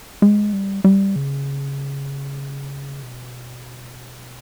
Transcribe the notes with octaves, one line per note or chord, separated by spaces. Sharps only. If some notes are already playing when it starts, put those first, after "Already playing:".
G#3
G3
G3
C#3
B2